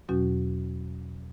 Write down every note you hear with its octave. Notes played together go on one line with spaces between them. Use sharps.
E2 B2 F#3 C#4 F#4